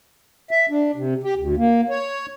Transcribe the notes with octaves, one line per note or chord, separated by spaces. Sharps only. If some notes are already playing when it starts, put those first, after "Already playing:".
E5
D4
C3
G4
D2
A#3
C#5